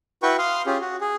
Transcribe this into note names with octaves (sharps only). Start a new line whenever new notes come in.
E4 F#4 B4 G5 C#6
F5 C6 D#6 F6
C#4 F4 G4 G#4
F#4
G#4